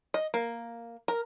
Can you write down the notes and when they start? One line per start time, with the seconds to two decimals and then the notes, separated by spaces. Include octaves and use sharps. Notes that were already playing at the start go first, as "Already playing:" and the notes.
0.14 D#5
0.34 A#3
1.08 A#4